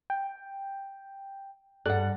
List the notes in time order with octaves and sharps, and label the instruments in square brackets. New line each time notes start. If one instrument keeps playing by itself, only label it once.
[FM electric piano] G5
[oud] G2 [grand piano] A4 [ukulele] D5 F#5 [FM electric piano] F#6